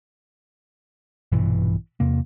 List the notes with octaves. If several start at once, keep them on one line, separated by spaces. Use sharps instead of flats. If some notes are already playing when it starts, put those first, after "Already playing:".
A#1 G2 B2 E3
E2 C3 A#3